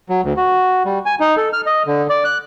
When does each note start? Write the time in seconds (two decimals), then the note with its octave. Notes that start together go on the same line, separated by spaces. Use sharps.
0.09 F#3
0.24 D2
0.37 F#4
0.85 G3
1.06 G#5
1.20 D#4
1.37 A4
1.53 F6
1.66 D#5
1.87 D3
2.10 D5
2.24 F#6